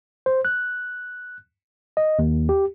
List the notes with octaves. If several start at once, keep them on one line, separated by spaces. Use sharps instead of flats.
C5
F#6
D#5
D#2
G4